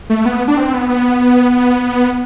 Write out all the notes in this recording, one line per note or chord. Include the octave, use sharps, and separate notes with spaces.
A3
B3
D4
C4
B3
B3